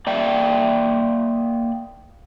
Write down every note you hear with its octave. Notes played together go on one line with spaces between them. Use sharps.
A#3 D5 E5 G5